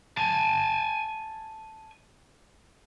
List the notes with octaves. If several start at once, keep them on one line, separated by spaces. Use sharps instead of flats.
G#5 A5